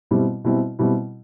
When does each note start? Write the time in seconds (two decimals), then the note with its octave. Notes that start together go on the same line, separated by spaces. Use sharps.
0.11 B2 G3 C4 E4
0.44 B2 G3 C4 E4
0.79 B2 G3 C4 E4